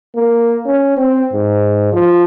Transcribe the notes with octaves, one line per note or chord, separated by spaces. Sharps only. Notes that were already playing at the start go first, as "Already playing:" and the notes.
A#3
C#4
C4
G#2
F3